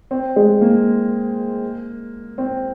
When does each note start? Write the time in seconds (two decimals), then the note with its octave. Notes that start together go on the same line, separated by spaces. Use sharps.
0.11 C4
0.36 G#3
0.61 A#3
2.38 C4